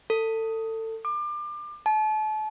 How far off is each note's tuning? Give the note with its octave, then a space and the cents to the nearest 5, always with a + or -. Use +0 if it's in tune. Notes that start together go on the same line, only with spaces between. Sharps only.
A4 +25
D6 +30
A5 -35